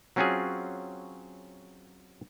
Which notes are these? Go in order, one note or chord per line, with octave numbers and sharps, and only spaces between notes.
F#3 C4 C#4 F4 F#4 G#4